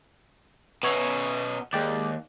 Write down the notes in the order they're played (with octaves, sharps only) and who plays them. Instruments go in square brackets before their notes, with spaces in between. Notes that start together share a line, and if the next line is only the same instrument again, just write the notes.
[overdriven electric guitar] B2 C#4 [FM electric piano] B3 C#5 E5
[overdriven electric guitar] D#2 [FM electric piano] G#3 G4 D5